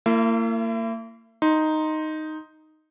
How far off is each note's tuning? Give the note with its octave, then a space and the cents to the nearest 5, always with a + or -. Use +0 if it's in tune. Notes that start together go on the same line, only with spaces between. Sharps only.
A#3 -35 E4 +40 E5 +35
D#4 +0 C6 +0